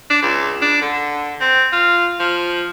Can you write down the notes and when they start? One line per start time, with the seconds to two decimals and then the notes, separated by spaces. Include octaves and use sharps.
0.10 D4
0.22 C#2
0.62 D4
0.82 D3
1.41 C4
1.73 F4
2.20 F3